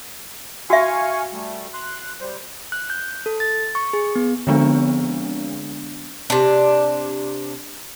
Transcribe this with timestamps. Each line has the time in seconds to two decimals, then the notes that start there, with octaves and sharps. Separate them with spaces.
0.70 F#4 E5 F5 G#5 C#6
1.33 G3 A3
1.74 C6 F#6
2.21 G3 C5
2.72 F#6
2.90 G6
3.26 A4
3.40 A6
3.75 C#6
3.93 G#4
4.15 B3
4.47 D3 F3 G#3 B3 C4 D4
6.30 C3 D4